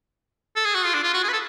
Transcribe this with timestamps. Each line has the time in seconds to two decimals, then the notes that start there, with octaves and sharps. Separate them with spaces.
0.56 A4
0.65 G#4
0.75 F#4
0.85 F4
0.94 D4
1.04 F4
1.14 F#4
1.23 G#4
1.29 B4
1.33 A4